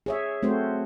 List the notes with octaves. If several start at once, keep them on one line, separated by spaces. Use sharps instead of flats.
G#4 C#5 E5
A3 C4 F#4 C5